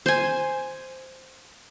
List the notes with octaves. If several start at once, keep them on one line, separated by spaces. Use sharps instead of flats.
C5 G#5